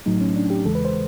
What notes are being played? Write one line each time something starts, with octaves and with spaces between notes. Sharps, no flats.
A2 F#3 A3 D#4
C#4
D4
G4
E2 C#3 E3 G#3 A4
B4
C5